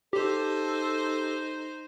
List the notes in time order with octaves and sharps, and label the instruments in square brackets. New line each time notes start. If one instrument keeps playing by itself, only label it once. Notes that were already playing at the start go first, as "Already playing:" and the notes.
[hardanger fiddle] D#4 C5 [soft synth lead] G4 [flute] A4